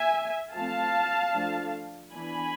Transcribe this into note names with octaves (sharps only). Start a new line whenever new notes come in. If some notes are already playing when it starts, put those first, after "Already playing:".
Already playing: E5 G#5
F3 A3 C4 F5 A5
F3 A3 D4
E3 B3 D4 G#5 B5